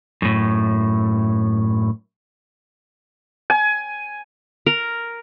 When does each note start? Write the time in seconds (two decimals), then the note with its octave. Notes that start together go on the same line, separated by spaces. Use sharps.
0.22 F#2 A2
3.50 G#5
4.66 A#4